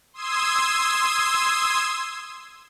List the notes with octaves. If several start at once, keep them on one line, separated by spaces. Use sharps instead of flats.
C6 D#6 E6 G#6